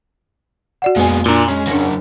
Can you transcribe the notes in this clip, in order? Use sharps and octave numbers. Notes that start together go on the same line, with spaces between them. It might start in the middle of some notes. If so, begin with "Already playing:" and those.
F#4 D5 F#5
F2 A#2 G#3 B3 G#5
A#2 D4 A#5 C6
G#3 C#4
F#3 A#3 D4 A#4 A#6